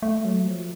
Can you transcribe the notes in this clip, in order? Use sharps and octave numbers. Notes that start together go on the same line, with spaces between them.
A3
F#3
F3